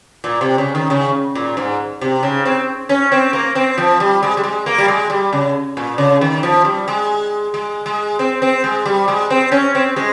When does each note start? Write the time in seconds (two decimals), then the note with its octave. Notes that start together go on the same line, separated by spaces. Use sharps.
0.24 A#2
0.41 C3
0.58 C#3
0.75 D#3
0.90 C#3
1.35 A#2
1.57 G#2
2.01 C3
2.23 C#3
2.45 C4
2.89 C#4
3.12 C4
3.33 A#3
3.55 C4
3.78 F3
4.00 G3
4.23 G#3
4.37 G3
4.43 G#3
4.66 A#3
4.78 G3
4.88 G#3
5.10 G3
5.33 C#3
5.77 A#2
5.98 C#3
6.21 D#3
6.43 F3
6.65 G3
6.88 G#3
7.54 G#3
7.86 G#3
8.19 C4
8.42 C4
8.64 G#3
8.86 G3
9.08 G#3
9.30 C4
9.52 C#4
9.75 C4
9.96 G#3